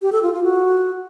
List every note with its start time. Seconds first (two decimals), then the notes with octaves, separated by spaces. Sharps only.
0.02 G4
0.12 A4
0.23 F4
0.33 F4
0.44 F#4